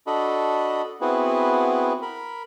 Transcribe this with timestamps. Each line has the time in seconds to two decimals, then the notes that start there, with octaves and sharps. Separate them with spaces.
0.07 D4 F#4 A4 D#5 B5
1.01 B3 C4 E4 F#4 G#4 B4
2.02 A#4 B5